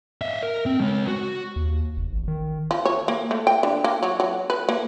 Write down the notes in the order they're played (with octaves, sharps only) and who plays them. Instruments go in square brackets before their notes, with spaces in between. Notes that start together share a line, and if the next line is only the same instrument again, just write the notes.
[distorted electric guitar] D#5 E5
A#4
C4
G#3 C#5
F#4
[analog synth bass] D#2
F1
A1
D#3
[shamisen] F3
C#5
A#3
A3
G5
D3
A#3
F#3
F#3
B4
A#3